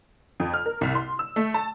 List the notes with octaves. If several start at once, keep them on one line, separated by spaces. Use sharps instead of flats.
F2
F6
A#4
C2
C6
E6
A3
A5